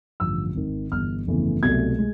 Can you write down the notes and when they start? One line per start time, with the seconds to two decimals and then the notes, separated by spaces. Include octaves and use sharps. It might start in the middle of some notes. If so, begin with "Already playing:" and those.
0.20 A1 G2 D3 F3 E6
0.55 G#1 G#2 D#3
0.92 G1 G2 E3 F6
1.27 G1 F2 C#3 E3 A3
1.63 C2 B2 F#3 A3 G#6
1.99 G#3